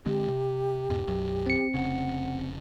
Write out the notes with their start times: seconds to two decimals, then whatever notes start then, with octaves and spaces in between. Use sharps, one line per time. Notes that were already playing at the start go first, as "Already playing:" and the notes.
0.06 D3 G#3 C4 G4
0.28 C3
0.90 E2 G#2 B2
1.07 B1 F#2 F#3
1.46 C4 C#7
1.74 F1 C#3 F#5